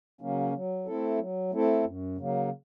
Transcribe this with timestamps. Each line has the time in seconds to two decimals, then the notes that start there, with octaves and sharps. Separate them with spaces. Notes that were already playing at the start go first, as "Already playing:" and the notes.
0.21 C#3 F#3 A#3 C#4
0.54 F#3
0.86 A3 C4 E4 A4
1.19 F#3
1.52 A3 C4 E4 A4
1.84 F#2
2.18 C#3 F#3 A#3